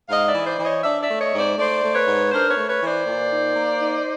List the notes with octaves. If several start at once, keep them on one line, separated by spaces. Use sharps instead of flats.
G#2 D#5 F5
D5 E5
E3
C5 D5
E3
C#5 D#5
D4 D5 E5
D5 E5
A3
C#5 D#5
G#2
C5 D5
A3 C5 D5
A3
B4 C#5
G#2
D4 A#4 C5
B4 C#5
A3
B4 C#5
E3
C5 D5
A#2
D#4
A#3
D#4